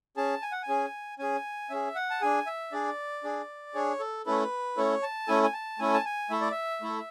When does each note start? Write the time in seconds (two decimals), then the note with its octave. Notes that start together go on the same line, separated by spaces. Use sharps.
0.17 C#4 G#4 A5
0.42 G#5
0.52 F#5
0.63 G#5
0.68 C#4 G#4
1.19 C#4 G#4 G#5
1.70 C#4 G#4 E5
1.95 F#5
2.10 A5
2.21 D4 G#4 G#5
2.46 E5
2.72 D4 G#4 D5
3.24 D4 G#4
3.74 D4 G#4 C#5
4.00 A4
4.26 A3 C#4 E4 A4 B4
4.77 A3 C#4 E4 A4 C#5
5.03 A5
5.28 A3 C#4 E4 A4 G#5
5.43 G#5
5.53 A5
5.79 A3 C#4 E4 A4 G#5
5.94 A5
6.05 G#5
6.30 A3 E4 A4 E5
6.41 D5
6.51 E5
6.82 A3 E4 A4